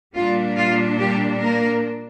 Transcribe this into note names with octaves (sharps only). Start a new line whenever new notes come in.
A#2 G3 A#3 D4 F4
F4
G3 G4
A#3 A#4